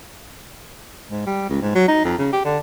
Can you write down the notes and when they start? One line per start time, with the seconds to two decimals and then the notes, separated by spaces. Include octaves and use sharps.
1.10 G#2
1.26 G3
1.49 C#2
1.62 G#2
1.75 F#3
1.88 D#4
2.04 F2
2.18 C#3
2.33 G4
2.45 D3